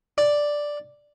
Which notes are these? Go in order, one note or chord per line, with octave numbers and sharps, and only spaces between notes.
D5